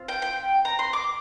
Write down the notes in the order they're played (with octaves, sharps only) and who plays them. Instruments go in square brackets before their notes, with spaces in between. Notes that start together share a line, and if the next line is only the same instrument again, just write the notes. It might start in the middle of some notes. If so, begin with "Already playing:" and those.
Already playing: [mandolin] C4 F4
G5
G5
A#5
C6
D6